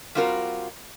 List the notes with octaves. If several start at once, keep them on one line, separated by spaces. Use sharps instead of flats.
G3 C4 F4 F#4 A#4